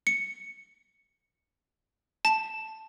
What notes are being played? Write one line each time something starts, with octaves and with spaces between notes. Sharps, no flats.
C#7
A5